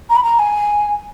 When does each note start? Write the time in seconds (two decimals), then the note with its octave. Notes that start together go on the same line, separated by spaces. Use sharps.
0.09 A#5
0.15 B5
0.23 A#5
0.38 G#5